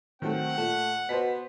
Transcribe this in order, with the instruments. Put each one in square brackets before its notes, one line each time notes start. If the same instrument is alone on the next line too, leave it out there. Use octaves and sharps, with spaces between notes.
[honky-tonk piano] D#3 F#3 A3 [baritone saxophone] C4 [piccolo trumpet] F#5
[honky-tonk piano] A#2 [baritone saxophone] A3
[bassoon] B2 [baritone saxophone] B3 [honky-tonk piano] C5 B6